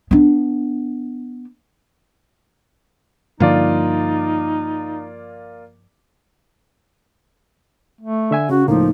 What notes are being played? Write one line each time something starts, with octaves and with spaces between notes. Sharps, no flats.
B3 D4
G2 D3 F3 A#3 D#4 F4 D5
A3
D3 E5 G#5
C#3 C#4 F#4
C#2 A2 F3 A#3 D#4